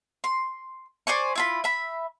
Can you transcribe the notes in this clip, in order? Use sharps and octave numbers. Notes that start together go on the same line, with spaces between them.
C6
C5 D5 G#5 C#6
E4 F4 B5
E5 B5